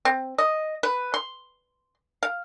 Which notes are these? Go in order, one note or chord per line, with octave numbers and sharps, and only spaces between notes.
C4
D#5
B4
C6
F5